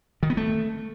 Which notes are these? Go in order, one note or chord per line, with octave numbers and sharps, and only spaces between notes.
D#3
B3
A3